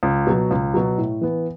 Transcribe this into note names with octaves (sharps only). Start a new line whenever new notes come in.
C#2
B2 F#3
C#2
B2 F#3
A2
E3 B3